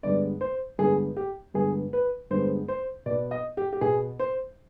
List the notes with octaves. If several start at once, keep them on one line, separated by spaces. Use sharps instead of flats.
G2 D3 G#3 B3 D5
C5
G2 D3 G#3 B3 G#4
G4
G2 D3 G#3 B3 G#4
B4
G2 D3 G#3 B3 C5
C5
B2 B3 D5
D#5
G4
G4
B2 B3 G#4
C5